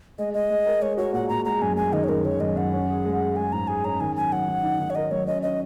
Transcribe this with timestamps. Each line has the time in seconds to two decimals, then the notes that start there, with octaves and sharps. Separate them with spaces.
0.18 G#3 D#5
0.34 G#3 D#5
0.50 G#3
0.66 A#4
0.82 G#3 C#5
0.97 F#4 C#5
1.13 A#2 F#5
1.29 A#2 A#5
1.45 G#3 A#5
1.62 F#2 G#5
1.77 G#3 G#5
1.93 D#3 D#5
2.04 C#5
2.09 F#2 A#4
2.25 D#3 C#5
2.40 F#2 D#5
2.56 F#2 F#5
2.73 C#4
2.89 G#4
3.05 G#3
3.21 G#4
3.36 G#3 G#5
3.53 G#2 A#5
3.67 G#4 G#5
3.84 C#4 A#5
4.00 D#3 G#5
4.16 F#3 G#5
4.32 F#3 F#5
4.48 D#3
4.63 D#4
4.80 D#3
4.90 C#5
4.95 A#4 D#5
5.11 F#3 C#5
5.27 C#4 D#5
5.43 C#4 D#5